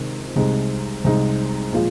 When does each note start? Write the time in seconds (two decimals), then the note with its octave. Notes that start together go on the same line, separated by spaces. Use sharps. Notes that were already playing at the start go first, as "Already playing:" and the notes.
Already playing: C3 D#3 G#3 C4
0.36 C2 C3 G#3 D#4
1.04 C2 C3 G#3 D#4
1.73 A#2 F3 G#3 F4